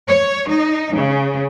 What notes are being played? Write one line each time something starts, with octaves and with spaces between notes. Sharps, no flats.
C#5
D#4
C#3